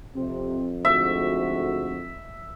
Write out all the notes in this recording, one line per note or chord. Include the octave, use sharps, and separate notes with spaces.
F2 C3 C4
D2 G#2 F#4 E5